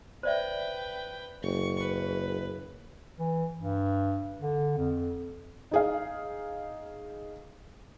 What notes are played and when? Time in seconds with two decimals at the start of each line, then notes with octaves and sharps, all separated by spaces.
0.23 B4 C5 D5 E5 G5
1.43 F#1 C#6
1.80 B4
3.20 E3
3.60 G2
4.40 D3
4.78 F2
5.71 D#4 G#4 F5